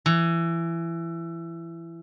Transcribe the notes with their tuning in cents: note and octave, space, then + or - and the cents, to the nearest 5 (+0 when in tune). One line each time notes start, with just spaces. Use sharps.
E3 +20